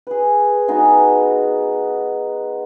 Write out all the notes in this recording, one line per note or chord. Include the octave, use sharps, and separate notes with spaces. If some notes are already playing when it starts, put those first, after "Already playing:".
G#4 B4
G#3 B3 D#4 F#4